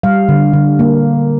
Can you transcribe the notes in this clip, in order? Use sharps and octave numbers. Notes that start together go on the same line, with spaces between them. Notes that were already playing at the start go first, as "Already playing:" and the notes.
G3 F5
D3
D3
A#3